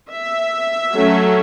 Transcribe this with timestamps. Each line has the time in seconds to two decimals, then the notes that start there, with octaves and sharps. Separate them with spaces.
0.10 E5
0.95 F#3 A3 C#4